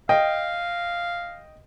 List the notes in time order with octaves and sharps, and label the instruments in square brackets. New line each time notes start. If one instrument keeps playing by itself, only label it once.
[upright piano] D#5 G5 [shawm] F5